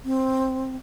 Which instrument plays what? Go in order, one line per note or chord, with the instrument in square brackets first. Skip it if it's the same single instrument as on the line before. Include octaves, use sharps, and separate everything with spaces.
[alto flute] C4